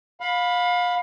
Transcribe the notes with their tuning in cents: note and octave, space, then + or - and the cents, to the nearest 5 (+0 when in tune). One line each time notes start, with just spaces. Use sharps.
F5 +30 B5 +0